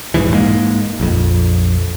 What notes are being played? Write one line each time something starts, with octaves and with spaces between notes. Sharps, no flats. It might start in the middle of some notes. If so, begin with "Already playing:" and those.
B1 E2 G#2 E3
G#2 G#3 A#3
A#1 F2